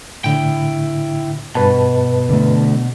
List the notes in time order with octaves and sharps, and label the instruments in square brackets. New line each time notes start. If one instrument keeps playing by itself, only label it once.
[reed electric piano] A2 D3 [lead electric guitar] E4 G5
[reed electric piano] G2 B4 A5 [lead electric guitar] B2
[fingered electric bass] D3 A3